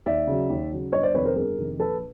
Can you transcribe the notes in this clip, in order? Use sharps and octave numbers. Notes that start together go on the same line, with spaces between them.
D#2 D5 E5
C#3 F#3
D#2
C#3 F#3
G1 C#5 D#5
C5 D5
F2 C3 D#3 B4 C#5
A#4 C5
G1 G#4 A#4
F2 C3 D#3
A#1 A4 B4